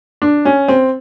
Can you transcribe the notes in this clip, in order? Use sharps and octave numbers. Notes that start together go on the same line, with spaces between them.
D4
C#4
C4